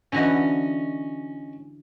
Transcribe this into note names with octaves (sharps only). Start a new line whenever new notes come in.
D3 E3 C#4 F#4 D#5